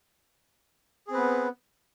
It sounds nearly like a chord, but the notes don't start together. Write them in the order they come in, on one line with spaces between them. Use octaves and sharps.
G#4 C4 B4 B3